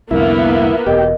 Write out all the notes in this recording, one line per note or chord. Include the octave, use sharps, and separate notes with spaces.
C2 F2 D3 A#3 B3 E4
E1 B2 G4 A#4 D#5